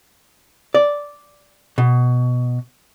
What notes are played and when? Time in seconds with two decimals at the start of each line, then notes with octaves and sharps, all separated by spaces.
0.74 D5
1.78 B2